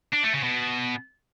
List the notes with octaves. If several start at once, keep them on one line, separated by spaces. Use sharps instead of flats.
D4
A3
C#3
B2